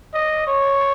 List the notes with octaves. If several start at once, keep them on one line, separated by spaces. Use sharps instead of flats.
D#5
C#5